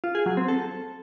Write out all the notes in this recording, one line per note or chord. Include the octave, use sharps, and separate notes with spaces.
F4
G#4
F#3
C4
A4